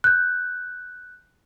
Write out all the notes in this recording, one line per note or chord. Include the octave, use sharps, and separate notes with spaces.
F#6 G6